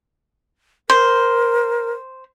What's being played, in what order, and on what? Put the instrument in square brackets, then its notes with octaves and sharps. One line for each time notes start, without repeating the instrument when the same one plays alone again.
[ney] A#4 [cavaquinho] C5